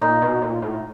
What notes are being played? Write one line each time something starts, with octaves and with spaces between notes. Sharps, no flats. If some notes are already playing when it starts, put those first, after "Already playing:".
A#2 D#4
B2
A#2
A2